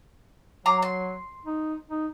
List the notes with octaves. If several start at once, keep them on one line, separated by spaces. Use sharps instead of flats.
F#3 A#5 C6 D6
C6
D#4
D#4